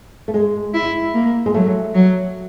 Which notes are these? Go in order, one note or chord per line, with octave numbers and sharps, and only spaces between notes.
A3
G#3
E4
A#3
G#3
F#3 A3
F#3